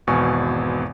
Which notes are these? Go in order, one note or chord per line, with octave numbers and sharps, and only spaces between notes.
G#1 E2 B2 G#5 C#6